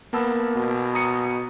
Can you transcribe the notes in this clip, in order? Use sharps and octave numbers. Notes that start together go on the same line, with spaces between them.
A#3 B3 A5 E6
B2
A#5 D#6 C#7